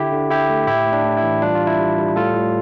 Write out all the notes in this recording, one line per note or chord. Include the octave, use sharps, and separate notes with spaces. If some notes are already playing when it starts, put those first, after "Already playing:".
Already playing: D3 E4 G4
D3
D3 E4 G4
A3
A2 E4 G4
A2
D4
A2
E4
E3
G3 D4 F4
F4
G3
E4
G3
G3
A2 F4 A4
A2